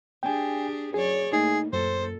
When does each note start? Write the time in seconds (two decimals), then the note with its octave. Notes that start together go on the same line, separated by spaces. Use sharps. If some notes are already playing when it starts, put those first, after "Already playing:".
0.23 D4 G4 G#4 G5 G#5
0.94 F#2 G#4 C#5 D5
1.33 A2 A#3 D#4 G#4
1.73 F#2 A#2 A4 C5